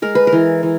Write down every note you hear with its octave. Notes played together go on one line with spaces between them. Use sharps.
G#3 A#4
B4
A#4
E3
E3